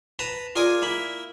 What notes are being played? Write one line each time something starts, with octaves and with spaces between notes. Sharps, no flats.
B4 A5 A#5
F4 G#4 A#4 D5 G#5
A#3 E4 B5